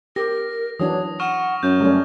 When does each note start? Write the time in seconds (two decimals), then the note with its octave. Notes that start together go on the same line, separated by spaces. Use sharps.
0.16 G4 A#4 A#6
0.80 E3 F#3 D4 C#5 D#6
1.20 F#5 C#6 F6 E7
1.63 F#2 C#5 G6
1.81 G3 A3 C#4